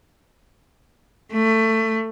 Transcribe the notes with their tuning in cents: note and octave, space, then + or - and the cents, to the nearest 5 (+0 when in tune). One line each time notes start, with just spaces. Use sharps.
A3 +20